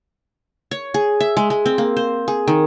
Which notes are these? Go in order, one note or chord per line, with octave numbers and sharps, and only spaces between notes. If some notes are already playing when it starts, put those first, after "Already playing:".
C#5
G#4
E5
G#3
G#3
C4
A#3
C5
G#4
D#3